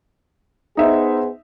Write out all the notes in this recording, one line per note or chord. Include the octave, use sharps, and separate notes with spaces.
B3 D#4 G#4 C5 E5